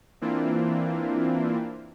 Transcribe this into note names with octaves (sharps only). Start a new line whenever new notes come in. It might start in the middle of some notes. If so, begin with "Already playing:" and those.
E3 A#3 C4 D4 E4 F4